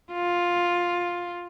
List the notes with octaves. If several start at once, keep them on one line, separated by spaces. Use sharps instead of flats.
F4